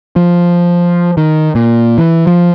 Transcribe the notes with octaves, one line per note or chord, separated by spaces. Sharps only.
F3
D#3
A#2
E3
F3